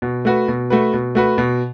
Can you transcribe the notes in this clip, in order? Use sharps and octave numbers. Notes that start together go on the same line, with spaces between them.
B2
A3 F#4 B4
B2
A3 F#4 B4
B2
A3 F#4 B4
B2